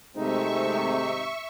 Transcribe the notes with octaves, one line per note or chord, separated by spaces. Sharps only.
G#1 C3 G#3 A3 C4 D#4 E5 C#6